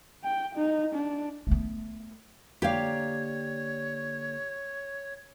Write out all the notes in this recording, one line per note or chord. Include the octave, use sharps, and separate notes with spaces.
G5
D#4
D4
A3 B3
D3 A#3 G4 C#5 D5 F5